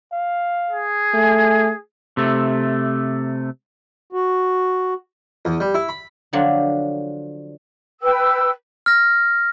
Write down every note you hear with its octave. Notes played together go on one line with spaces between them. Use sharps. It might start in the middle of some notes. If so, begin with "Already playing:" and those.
F5
G#4
A3 G#5
C3 A3
F#4
E2
G3
E4
B5
D3 F3 F#3 D4 F4
B4 G5 E6
F6 A#6